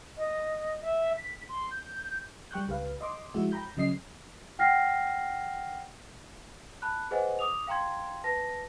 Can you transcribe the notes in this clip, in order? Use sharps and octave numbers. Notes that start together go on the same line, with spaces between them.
D#5
E5
B6
C6
G6
G3 G5 C#6 F#6 G6
C#2 G4 B4 F5
D#5 C6 D6
F3 G#3 E4 F#4 E5
G5 A#5 B5 G6
C#3 F#3 D#5 C7
F#5 G5 F6 A#6 C7
A5 B5 F#6
G#4 B4 C5 D#5 F#5 G#5
D6 D#6 F7
F5 G5 A#5 C6 G#6
B4 A5 A#6